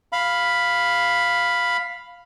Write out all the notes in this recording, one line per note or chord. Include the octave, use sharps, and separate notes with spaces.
F5 B5